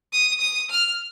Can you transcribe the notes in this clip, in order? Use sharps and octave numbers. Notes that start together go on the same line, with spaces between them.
D#6
D#6
F6